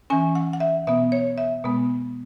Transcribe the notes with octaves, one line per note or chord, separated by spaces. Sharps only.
E3 C#4 G#5
F#5
F#5
E5
B2 B3 E5
C#5
E5
B2 G#3 B3